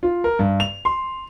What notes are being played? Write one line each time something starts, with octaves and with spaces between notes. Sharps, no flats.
F4
A#4
G2
F7
C6